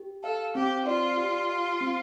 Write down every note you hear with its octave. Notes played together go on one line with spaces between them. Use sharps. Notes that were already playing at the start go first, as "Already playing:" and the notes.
Already playing: G4
A4 F5
C4 G4
F4 D5
G4
F5
C4